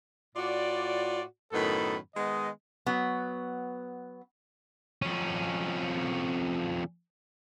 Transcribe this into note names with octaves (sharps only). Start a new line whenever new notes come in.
A2 F4 F#4 D5
F#2 A2 D#3 B3 A4 B5
D#3 G#3 B3 D#5
F#3 B3
F2 C#4